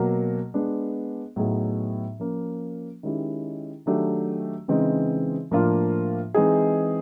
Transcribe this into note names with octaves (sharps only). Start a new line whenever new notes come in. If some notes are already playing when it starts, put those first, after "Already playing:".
Already playing: B2 F#3 A#3
G#3 B3 D4
A2 F#3 B3 D#4 G#4
F3 A#3 C#4
D#3 G#3 C#4 E4 G4
D#3 F#3 A3 D4 G4
C#3 E3 G#3 C4 D#4
A2 F3 A#3 D4 F4
E3 G#3 C4 D#4 G#4